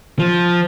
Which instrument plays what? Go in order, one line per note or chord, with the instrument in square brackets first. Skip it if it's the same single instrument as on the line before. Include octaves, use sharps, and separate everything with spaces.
[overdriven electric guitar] F3